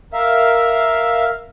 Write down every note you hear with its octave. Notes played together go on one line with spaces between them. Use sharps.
A#4 E5 F5